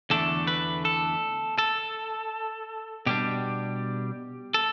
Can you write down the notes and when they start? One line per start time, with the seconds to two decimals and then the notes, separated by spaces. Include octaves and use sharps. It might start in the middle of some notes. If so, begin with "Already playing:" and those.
0.10 E2 D3 A3 D4 A4
0.47 B4
0.85 A4
1.59 A4
3.06 B2 G3 D4 G4
4.54 A4